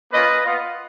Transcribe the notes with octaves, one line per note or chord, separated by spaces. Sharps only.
A#3 C#4 F4 B4 D#5
B3 F4